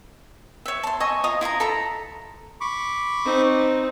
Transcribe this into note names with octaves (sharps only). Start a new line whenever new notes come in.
C#5 E5
A5 C6
D#5 E5 G#5 C#6
F4 D#5 A#5 D#6
E4 F4 D#5 A#5
A4 A#5 B5
B5 C#6 D6
C4 D#4